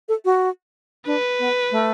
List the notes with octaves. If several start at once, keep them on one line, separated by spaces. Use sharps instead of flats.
A4
F#4
D4 B4
B3
A3